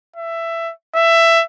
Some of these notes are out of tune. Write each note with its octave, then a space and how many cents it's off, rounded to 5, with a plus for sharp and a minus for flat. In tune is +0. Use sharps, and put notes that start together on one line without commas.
E5 +15
E5 +15